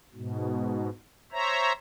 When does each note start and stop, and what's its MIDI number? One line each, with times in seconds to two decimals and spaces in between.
0.14 0.89 44
0.14 0.89 47
1.32 1.73 72
1.32 1.73 73
1.32 1.73 76
1.32 1.73 82